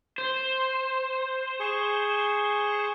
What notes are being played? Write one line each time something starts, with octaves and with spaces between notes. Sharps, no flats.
C5
G#4 C#6